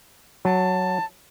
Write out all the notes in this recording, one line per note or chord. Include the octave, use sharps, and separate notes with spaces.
F#3 A5